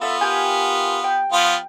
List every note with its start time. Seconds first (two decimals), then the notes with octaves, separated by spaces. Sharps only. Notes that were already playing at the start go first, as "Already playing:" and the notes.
0.01 B3 F4 A4 E5
0.21 G4 A#4 G#5
1.04 G5
1.32 F3 B3 F4